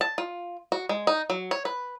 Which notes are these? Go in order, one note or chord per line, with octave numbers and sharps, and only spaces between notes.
A5
F4
F#4
G#3
D#4
F#3
C#5
B4